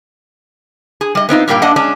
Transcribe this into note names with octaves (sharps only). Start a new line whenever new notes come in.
G#4
G3 D#5
B3 C4 D#4 F4
G2 A#2 G3 A#3 G5
G2 A#3 D4 D#5 F#5
G#3 C#4 D4